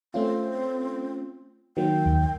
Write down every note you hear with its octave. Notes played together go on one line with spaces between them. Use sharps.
A3 C4 C#4 F4
D#3 F#3 A#3 G5
D#2